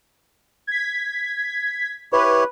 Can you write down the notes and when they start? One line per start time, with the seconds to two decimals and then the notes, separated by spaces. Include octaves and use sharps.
0.67 G#6 B6
2.12 E4 G4 B4 C#5